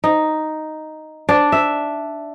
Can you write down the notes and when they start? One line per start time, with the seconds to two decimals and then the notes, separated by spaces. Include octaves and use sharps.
0.04 D#4
1.29 D4
1.52 E5